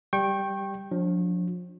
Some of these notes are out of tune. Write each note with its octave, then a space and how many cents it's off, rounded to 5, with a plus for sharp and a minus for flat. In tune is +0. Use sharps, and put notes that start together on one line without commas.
G3 +0 G5 +0 C#6 -30
F3 +40 D4 -15